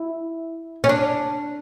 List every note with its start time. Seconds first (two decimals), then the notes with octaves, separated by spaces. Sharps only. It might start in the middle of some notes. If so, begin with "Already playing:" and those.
Already playing: E4
0.84 C#4
0.89 D4